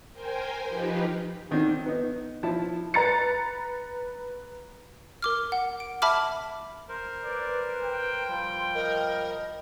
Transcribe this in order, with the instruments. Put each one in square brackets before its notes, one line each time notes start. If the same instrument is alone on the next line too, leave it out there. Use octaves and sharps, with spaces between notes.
[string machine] A#4 C5 G5 G#5
F3 D#4 F4 G4 B4
[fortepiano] D3 D#3 C4 D4
B3 D#4
F3 E4 A5
[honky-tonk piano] B4 A#5 A6 C#7
[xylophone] A#4 D6 F6
F#5
D7
E5 A5 B5 D6 F6
[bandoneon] A#4 C5
[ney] B4 [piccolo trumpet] D5
[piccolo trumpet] G5
[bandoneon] F3 G3 [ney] C6
[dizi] A#4 [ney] D#5